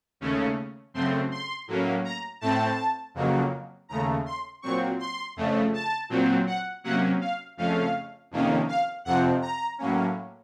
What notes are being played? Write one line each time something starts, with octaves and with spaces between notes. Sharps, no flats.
D#2 C#3 A3 C#4
F#2 C#3 A3 C4 C6
C6
A2 F#3 A#3 C#4
A#5
A2 A3 C4 A5
F2 C#3 F#3 A#3
D#2 C#3 A3 A#5
C6
A#2 F#3 C4 C#6
C6
F2 C#3 A3
A5
A#2 F#3 C4
F#5
C3 F#3 A#3 C#4 F#5
F5
F2 C#3 A3 C#4 F5
F2 C3 D#3 A#3 C#4
F5
F2 C3 F3 C4 F#5
A#5
A2 F#3 A#3 C#4